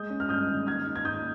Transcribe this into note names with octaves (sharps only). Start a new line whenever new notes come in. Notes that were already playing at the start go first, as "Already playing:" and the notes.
Already playing: G#3 D#6 G6
C#4
F6
G2 D#6 G6
D#3
A#3 F6 G#6
D#4
G#6
G#2 D#6 G6